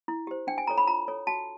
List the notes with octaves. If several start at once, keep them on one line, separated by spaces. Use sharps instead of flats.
E4
G4 C5
D4 G5
G#5
F4 A4 C#5 A#5
B5
F4 A#5
A4 C#5
F#4 A5